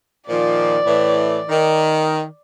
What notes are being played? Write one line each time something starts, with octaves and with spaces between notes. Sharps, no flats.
A#2 D#3 F3 D5
A2 E3
D#3